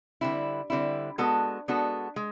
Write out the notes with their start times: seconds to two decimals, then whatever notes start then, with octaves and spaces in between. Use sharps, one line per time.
0.21 D3 G3 C4 E4
0.70 D3 G3 C4 E4
1.18 G#3 B3 D4 F#4 A4
1.68 G#3 B3 D4 F#4 A4
2.16 G#3